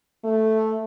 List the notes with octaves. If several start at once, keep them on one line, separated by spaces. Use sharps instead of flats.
A3